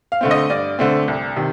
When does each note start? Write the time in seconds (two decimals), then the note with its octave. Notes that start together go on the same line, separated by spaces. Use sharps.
0.12 F5
0.21 D3 A3 C4
0.31 D#5
0.50 G2 D5
0.79 D3 A3 C4
1.08 C2
1.36 C3 D#3